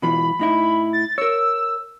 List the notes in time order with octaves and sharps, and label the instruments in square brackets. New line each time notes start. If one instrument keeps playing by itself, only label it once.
[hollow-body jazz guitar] B2 E3 F4 [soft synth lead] B5
[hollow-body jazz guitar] A2 D#4 E4
[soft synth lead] A6
[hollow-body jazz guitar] A#4 C#5 [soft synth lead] E6